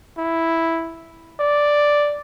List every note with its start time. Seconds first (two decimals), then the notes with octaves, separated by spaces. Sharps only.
0.18 E4
1.40 D5